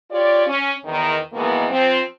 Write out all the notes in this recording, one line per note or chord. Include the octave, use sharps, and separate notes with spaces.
F4 G4 C#5 D5
C#4
E2 D#3
B2 D#3 E3 G#3 A#3 B3
F3 C4